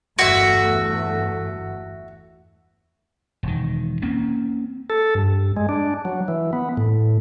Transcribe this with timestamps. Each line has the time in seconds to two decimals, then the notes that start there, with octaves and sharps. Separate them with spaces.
0.19 G1 E2 A3 F#4 E5
3.43 E1 D#3
4.02 A#3 C4 C#4
4.90 A4
5.15 G2
5.57 G#3
5.69 D4
6.05 F#3
6.28 E3
6.53 B3
6.77 A2